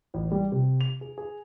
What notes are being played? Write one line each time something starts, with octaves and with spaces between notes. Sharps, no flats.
A1
G3
C3
F7
G#4
G#4